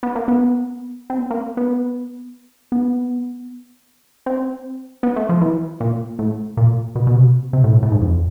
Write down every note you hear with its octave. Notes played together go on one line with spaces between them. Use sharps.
B3
A#3
B3
C4
B3
A#3
B3
B3
C4
B3
A3
F3
E3
A#2
A2
A#2
B2
B2
C3
C3
A2
A#2
A2
G#2
F2